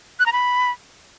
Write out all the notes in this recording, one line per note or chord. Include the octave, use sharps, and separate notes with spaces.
F#6
A#5
B5